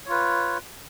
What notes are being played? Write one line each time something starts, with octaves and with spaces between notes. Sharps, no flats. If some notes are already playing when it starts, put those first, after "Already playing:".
F4 B4 C#5